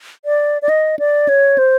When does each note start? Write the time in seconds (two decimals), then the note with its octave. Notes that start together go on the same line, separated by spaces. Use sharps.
0.25 D5
0.62 D5
0.69 D#5
0.99 D5
1.29 C#5
1.58 C5